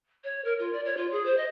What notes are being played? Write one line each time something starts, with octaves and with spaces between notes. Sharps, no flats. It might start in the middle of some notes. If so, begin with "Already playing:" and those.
C#5
A#4
F4
D5
C#5
F4
G#4
C5
D#5